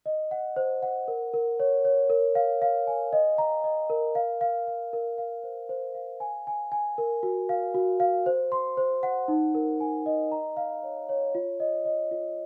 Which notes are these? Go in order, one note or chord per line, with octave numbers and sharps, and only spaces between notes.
D#5
F#5
C5
F#5
A#4
A#4
C#5
C#5
A#4
F5
F5
G#5
D#5
A#5
D#5
A#4
F5
F5
F5
A#4
F5
C5
C5
F5
G#5
G#5
G#5
A#4
F#4
F5
F#4
F5
C5
C6
C5
F#5
D#4
A#4
G#5
D#5
A#5
F5
C#5
C#5
F4
D#5
D#5
F4